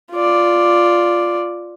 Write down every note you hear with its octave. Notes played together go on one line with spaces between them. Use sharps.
F4 D5